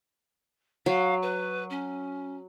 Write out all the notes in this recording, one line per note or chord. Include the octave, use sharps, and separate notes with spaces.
F#3 F5
B4
C#4